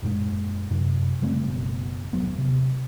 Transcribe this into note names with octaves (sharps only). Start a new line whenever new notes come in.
F#2 A#2 G#3
F#2 C3 F#3
C#3 G3 A3 C4
F#1 B2
D#1 F#3 B3
C3